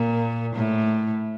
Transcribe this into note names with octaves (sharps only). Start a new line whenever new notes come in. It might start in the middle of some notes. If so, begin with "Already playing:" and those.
Already playing: A#2
A2